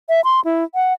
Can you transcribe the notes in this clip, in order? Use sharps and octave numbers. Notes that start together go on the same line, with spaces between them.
E5
C6
E4
F#5